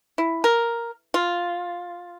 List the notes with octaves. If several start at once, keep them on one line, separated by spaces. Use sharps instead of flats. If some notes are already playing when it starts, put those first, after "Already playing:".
E4
A#4
F4